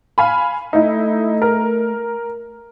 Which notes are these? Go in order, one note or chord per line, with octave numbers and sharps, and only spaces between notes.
F5 G#5 B5
A3 D#4 E4
A#4